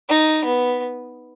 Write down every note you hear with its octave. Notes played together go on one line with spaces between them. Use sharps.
D#4
B3